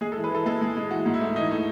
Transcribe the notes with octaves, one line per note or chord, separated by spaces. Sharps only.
G#3 G#4
A4
E3
B4
E3 A4
G#3 A4
G#3
G#3
E3 F#4
G#2
E4
A3
E3 D#4
A3